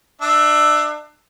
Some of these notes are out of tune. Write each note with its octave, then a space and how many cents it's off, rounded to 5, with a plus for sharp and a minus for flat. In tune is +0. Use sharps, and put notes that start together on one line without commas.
D4 +30 E5 +0